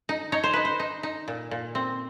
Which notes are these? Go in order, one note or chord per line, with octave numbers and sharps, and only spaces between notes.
D#4
D#4 C#5
C5
D#4 B4
C5
D#4
D#4
A#2
A#2
C4